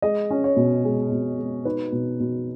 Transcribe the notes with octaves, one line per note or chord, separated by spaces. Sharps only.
G#3 D#5
C#4
C#5
B2
G#3
B2
G#3
D#4 B4
B2
B2